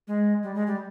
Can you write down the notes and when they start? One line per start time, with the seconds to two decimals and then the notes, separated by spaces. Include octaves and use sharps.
0.08 G#3
0.43 G3
0.55 G#3
0.67 G3